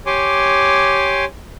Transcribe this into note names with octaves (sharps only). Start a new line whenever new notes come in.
G4 C#5 G#5 C6 D6